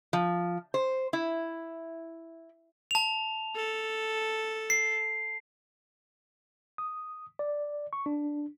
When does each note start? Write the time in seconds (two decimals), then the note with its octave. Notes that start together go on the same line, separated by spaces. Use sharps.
0.13 F3
0.74 C5
1.13 E4
2.91 A5 F7
3.55 A4
4.70 C7
6.78 D#6
7.39 D5
7.93 C#6
8.06 D4